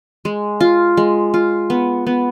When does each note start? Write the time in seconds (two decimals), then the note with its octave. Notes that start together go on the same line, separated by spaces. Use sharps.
0.25 G#3
0.60 F4
0.97 G#3
1.34 F4
1.70 B3
2.07 B3